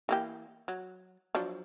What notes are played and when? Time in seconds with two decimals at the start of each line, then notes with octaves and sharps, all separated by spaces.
0.09 E3 A#3 G4
0.68 F#3
1.35 F3 F#3 D4